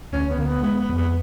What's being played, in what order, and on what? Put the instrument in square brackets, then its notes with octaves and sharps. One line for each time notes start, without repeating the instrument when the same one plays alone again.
[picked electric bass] D2 [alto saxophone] C#4
[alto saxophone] B3
[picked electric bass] D2 [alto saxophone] A#3
[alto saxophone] B3
[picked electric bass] G#3 [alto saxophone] B3
[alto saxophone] B3
[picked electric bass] F2
[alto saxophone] B3